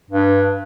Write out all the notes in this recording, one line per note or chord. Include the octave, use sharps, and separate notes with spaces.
G2